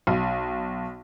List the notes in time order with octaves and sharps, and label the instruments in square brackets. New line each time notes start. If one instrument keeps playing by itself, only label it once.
[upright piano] B1